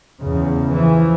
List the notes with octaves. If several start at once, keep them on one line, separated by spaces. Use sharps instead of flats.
E2 C#3
E3 F3